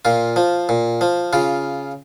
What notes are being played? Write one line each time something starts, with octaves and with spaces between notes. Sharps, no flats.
A#2 F4
F3
A#2
F3
C#3 F4